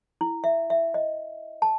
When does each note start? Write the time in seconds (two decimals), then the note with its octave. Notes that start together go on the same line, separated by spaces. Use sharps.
0.21 E4
0.44 E5
0.70 E5
0.94 D#5
1.62 A5